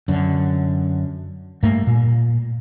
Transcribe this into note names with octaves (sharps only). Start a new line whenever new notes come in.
F#2 D3
G2 A3 A#3
A#2